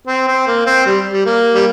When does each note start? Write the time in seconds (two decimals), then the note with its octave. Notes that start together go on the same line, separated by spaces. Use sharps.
0.07 C4
0.27 C4
0.47 A#3
0.66 C4
0.86 G3
1.11 G3
1.26 A#3
1.54 G3